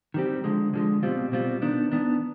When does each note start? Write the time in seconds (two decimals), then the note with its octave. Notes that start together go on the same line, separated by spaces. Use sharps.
0.14 D#3 G3 C4 G4
0.44 D3 F3 G#3
0.74 D3 F3 G#3
1.03 B2 G3 C4 F4
1.32 B2 G3 C4 F4
1.62 D#3 B3 D4
1.92 D#3 B3 D4